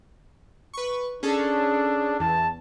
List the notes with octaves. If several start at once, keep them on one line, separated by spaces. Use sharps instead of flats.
B4 C#6
C#4 D4 G#4 A4
E2 A5